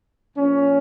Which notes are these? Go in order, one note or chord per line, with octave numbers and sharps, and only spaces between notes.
A#2 F3 C#4